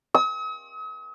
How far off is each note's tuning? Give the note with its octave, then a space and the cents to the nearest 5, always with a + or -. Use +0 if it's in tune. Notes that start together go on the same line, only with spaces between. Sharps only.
D#6 +45